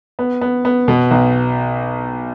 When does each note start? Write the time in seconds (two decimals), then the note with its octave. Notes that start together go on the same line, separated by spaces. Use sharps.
0.19 B3
0.41 B3
0.65 B3
0.88 B2
1.11 B1